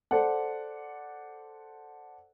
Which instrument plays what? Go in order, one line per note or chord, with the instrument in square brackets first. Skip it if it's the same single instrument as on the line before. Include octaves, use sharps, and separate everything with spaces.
[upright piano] A4 C5 D5 F#5